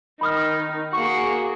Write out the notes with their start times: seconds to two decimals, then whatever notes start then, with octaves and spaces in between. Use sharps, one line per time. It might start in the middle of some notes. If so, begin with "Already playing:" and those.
0.21 D#3 D#4 B5 D#6 F6
0.93 A#3 F#4 G#4 F#5 C#6